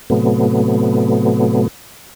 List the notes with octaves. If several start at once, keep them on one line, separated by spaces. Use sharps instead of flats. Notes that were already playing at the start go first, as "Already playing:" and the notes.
A2 C3 F#3 A3 B3